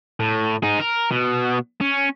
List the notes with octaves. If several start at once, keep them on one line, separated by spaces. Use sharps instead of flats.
A2
D#4 G#4
A#4
B2
C#4